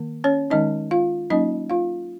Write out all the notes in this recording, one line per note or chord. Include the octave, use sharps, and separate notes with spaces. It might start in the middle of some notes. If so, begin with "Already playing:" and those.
Already playing: D#3 A#3
C#4 C#5
D#3 G#3 C#4 D#4 D#5
F4 F5
F#3 A#3 C#4 D#4 D#5
F4 F5